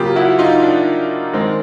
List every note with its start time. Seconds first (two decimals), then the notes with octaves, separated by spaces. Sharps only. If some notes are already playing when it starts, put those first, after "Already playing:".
Already playing: C#3 F#3 A#3 F4 G4
0.16 E4 F#4
0.39 D#4 F4
0.63 D4
1.33 D#3 G#3 C4